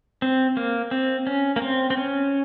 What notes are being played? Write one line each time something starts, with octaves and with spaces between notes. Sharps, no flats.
C4
A#3
C4
C#4
A#3
C4
C4
C#4